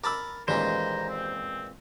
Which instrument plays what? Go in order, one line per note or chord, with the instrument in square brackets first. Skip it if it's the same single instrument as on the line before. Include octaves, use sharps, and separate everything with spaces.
[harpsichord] A#4 A5 B5 [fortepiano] D6 E6
[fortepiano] A1 D#2 [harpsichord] A#2 E3 G#3 [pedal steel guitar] C5 [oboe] A#5
[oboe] C4